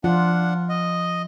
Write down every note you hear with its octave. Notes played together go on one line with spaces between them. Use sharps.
F3 D4 F4 F#5
D#5